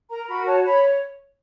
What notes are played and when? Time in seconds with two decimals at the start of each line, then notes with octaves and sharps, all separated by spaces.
0.10 A#4 A#5
0.28 F#4 B5
0.46 C#5 A5
0.63 C#5 B5